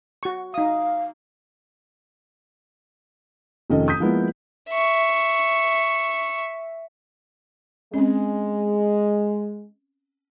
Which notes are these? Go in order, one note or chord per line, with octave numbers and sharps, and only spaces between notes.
F#4 C#6
D#4 F5 D#6
F1 D#3 F3 C#4 A4 D#5
D#6 G6 B6
F3 G#3 A#3 B3 E4
E5 C#6
G#3 C4 C#4